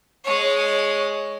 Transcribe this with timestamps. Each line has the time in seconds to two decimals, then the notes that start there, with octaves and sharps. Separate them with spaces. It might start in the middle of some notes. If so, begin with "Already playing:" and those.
0.24 G#3 C#5